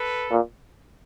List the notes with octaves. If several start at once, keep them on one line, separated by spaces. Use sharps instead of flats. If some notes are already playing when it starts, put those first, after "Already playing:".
Already playing: A4 B4
A#2